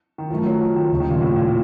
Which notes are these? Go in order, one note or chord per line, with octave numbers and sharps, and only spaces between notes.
D#3
F#2 D#3 F3 A3
F#3
F3
D#3
D#2 C#3 F#3 A3
D#3
A#2
A2
A#2